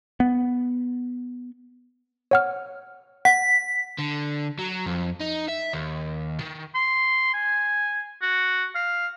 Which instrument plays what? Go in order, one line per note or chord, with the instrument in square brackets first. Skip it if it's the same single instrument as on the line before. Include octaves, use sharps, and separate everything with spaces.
[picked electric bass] B3
[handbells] C#5 F#5 F6
[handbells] F#5 [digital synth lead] B6
[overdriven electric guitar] D3
F#3
F2
D#4
E5
D#2
D#3
[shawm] C6
G#5
F#4
F5